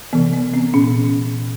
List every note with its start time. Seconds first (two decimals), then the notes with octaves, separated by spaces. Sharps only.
0.13 C3 E3 B3
0.33 B3
0.54 C4
0.74 A#2 C#4